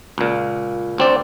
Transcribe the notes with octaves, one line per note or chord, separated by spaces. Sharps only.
C#2 A#2
D2 C4 D5